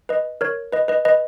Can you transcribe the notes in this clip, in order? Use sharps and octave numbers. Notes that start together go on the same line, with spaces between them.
B4 D#5
A#4 C#5
B4 D#5
B4 D#5
B4 D#5